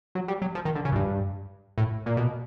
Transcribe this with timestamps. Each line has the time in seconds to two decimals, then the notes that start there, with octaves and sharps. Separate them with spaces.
0.15 F#3
0.28 G3
0.42 F#3
0.55 F3
0.65 D#3
0.75 D3
0.85 C#3
0.92 F#2
0.95 G2
1.78 A2
2.06 A#2
2.17 B2